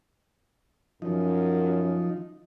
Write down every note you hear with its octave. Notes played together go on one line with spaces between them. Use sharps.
F#2 F3 D#4